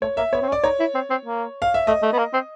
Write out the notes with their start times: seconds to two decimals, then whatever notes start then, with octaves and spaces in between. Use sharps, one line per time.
0.02 A3 C#5
0.17 A#3 E5
0.33 B3 C#5
0.42 C4
0.48 C#4
0.52 D5
0.64 D#4 C#5
0.80 E4
0.95 C4
1.10 C4
1.25 A#3
1.62 F5
1.74 E5
1.87 A3 D#5
2.03 A3
2.13 B3
2.18 A#3
2.33 C4